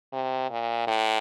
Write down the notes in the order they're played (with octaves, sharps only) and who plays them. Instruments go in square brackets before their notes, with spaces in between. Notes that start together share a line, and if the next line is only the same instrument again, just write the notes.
[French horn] C3
A#2
A2